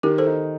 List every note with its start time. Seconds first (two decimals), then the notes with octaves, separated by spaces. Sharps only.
0.03 D#3 G4 A#4
0.18 A4 C5
0.27 D#4